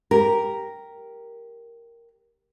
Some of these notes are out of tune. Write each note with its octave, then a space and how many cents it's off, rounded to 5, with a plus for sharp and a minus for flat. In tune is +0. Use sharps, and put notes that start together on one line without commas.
G4 +0 A#4 +0